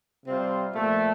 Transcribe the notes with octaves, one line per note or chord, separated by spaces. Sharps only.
C3 G3 C4 F4 C5
A#2 F3 A3